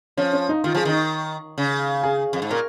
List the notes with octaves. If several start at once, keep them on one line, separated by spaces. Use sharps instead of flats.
F3 C#4
C#4
D#4
D#3 F4
F3 G#4
D#3 D#4
C#3
G#4
F2
G#2
A#2 A#4